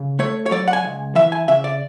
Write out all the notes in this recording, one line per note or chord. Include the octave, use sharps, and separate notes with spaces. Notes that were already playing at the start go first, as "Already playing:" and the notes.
Already playing: C#3
A3 C#5
C#5
F#3 D5
F#5
G#5
C#2
E3 E5
G#5
C#3 E5
D5